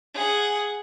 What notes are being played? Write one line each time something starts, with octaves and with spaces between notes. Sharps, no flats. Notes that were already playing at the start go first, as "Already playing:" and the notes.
G#4 F#5